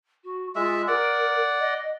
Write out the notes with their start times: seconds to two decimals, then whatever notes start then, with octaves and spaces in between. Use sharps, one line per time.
0.24 F#4
0.56 G#3 F4 E5
0.87 A#4 D5 F#5
1.60 D#5